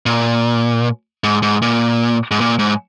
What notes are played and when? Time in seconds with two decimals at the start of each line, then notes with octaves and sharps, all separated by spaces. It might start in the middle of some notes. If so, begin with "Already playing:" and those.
0.06 A#2
1.24 G#2
1.43 G#2
1.62 A#2
2.31 G#2
2.41 A#2
2.59 G#2